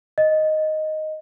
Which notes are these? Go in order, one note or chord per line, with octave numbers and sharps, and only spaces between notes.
D#5